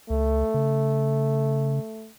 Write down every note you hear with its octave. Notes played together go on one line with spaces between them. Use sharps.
C#2 A3
C#3